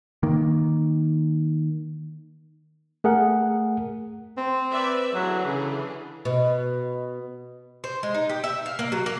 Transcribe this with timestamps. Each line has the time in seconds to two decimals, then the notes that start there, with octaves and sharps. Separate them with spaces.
0.23 D#3 A#3
3.04 A3 G#4 A#4 F#5
4.37 C4
4.70 B4 D5 E5
5.15 D3 E3 F#3 G#4
5.46 C#3
6.25 B2
7.84 C5
8.03 G#3
8.15 D#4
8.29 G4
8.44 E5
8.66 F5
8.79 A#3
8.92 F#3
9.06 A#3